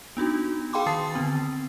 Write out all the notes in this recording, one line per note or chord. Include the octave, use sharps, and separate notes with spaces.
B3 D4 D#4 F#4
G#4 F5 G5 B5 C6 D6
D#3 A5 D#6 A6 C7
D3 B3 C4